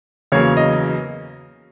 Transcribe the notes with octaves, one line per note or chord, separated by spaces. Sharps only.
E2 C#3 F#3 A#3 C#5
D#5